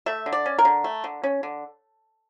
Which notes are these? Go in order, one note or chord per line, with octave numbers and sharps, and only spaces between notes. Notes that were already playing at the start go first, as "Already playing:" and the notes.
A3 E5
D3
D5
C#4
A#4
D3
A3
D3
C#4
D3